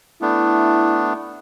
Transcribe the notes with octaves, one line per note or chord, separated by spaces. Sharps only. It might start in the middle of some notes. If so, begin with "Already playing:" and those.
A3 B3 D4 E4